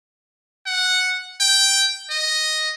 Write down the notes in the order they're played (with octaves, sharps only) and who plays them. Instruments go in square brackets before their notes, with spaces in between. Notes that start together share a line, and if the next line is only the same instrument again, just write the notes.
[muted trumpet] F#5
G5
D#5